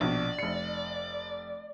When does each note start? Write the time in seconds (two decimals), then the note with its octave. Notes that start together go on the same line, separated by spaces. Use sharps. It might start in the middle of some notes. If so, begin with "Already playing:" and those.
0.01 A#1 B2 D5
0.39 F1 C#7